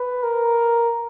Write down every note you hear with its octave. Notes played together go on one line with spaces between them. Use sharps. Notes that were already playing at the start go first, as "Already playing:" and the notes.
Already playing: B4
A#4